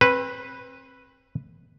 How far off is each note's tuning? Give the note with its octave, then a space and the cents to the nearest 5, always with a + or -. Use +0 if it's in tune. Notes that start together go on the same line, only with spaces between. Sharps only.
C4 +30 B4 +0